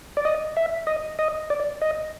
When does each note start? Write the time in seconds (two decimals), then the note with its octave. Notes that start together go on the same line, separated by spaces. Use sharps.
0.17 D5
0.25 D#5
0.57 E5
0.87 D#5
1.19 D#5
1.50 D5
1.82 D#5